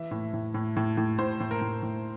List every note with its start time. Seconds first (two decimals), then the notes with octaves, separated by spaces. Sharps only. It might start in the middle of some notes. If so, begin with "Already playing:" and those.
Already playing: E3 E5
0.11 A2
0.33 A2
0.54 A2
0.76 A2
0.97 A2
1.19 A2 C5
1.40 A2
1.51 A#4
1.61 A2
1.82 A2